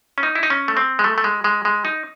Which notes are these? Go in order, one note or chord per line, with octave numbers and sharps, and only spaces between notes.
C#4
D#4
E4
D#4
C#4
A3
C4
G#3
A3
A3
G#3
G#3
G#3
D#4